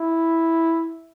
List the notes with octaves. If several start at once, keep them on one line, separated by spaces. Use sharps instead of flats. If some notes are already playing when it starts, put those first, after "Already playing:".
Already playing: E4